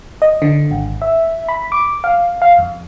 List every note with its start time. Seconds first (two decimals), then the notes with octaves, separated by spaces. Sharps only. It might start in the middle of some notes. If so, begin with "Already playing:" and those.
0.22 D#5
0.42 D3
0.71 G#1
1.02 E5
1.49 B5
1.72 D6
2.04 F5
2.42 F5
2.58 F2